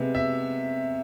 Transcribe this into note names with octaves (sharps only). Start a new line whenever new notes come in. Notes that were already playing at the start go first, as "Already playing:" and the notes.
Already playing: C3 G#3 B3 E5
E5